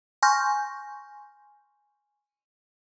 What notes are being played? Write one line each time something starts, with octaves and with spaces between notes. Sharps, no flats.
G#5 C6 C#6 F6 G6 A#6